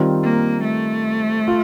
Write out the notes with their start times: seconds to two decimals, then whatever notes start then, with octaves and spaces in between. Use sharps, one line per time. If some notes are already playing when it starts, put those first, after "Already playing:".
Already playing: D#3 G3 C4 F4
0.24 A#3
0.65 A3
1.48 F4